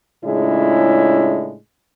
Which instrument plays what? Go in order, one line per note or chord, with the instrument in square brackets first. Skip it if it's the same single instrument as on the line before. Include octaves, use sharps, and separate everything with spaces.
[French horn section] A2 C#3 G#3 D4 E4 F4